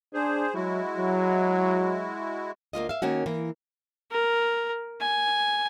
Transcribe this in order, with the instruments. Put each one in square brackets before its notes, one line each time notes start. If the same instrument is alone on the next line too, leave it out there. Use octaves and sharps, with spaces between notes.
[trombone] D4 [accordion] G#4 C5
[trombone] F#3 [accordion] G#3 E4 F#4
[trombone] F#3
[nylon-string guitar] D2 A#3 F4 D#5
E5 F5
D#3 A#3 C#4 F#4
E3 A#3
[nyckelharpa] A#4
G#5